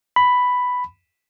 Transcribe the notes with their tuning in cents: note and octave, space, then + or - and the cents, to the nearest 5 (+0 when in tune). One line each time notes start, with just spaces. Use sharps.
B5 +5